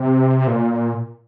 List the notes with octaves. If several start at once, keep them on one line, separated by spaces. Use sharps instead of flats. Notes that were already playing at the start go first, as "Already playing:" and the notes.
Already playing: C3
A#2